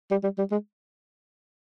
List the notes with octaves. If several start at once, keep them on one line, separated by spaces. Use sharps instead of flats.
G3
G3
G3
G#3